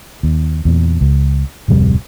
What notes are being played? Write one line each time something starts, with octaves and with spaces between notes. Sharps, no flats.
D#2
E2 A#2
C#2
D1 F2 C3 G3